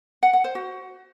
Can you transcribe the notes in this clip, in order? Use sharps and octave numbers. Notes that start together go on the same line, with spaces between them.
F#5
F#5
C5
F#4